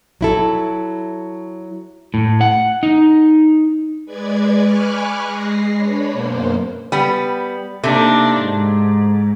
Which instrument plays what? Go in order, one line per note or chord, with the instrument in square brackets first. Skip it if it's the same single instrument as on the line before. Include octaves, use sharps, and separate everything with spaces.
[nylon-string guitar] F#3 E4 A4
[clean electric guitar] A2
F#5
D#4
[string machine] G#3 B4 D5 G#6
G#5 B5 C#6 D6 F6 F#6
G#3 A#6 C7
D4 B4 C#5 B5
F#2 B2 A#3 C5
[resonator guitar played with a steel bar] G3 B3
[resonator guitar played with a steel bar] C3 A3 [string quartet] A#3 D4 D#4
[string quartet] G#2